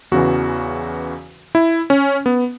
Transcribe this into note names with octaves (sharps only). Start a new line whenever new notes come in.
E2 C#3 E3 F#4
E4
C#4
B3